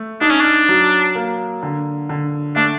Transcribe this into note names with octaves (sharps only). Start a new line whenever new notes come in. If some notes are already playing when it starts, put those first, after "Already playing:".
Already playing: A3
D4 D#4
C#4
D4
F#3
A#3
D3
D3
A3 D4